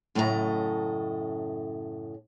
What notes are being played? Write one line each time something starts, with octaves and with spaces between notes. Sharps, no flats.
F#2 A2 C#3 A4 D#5 A#5